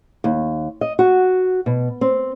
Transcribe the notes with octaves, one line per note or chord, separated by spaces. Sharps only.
D#2
D#5
F#4
B2
C4